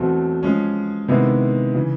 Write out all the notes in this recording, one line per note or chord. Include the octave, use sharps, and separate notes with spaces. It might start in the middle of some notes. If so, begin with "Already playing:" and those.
Already playing: E2 B2 F#3 A3 C4
F3 G#3 C#4
C3 D#3 G#3 B3 E4
C#3 E3